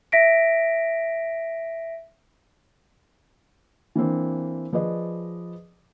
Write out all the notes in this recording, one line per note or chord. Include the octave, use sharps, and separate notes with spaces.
E5 A#6 B6 D7
E3 A#3 C4 D4
F3 G#4 B4 D5 D#5